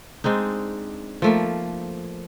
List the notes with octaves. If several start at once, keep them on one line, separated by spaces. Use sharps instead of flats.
G#3 C4 D4 D#4
F3 A3 A#3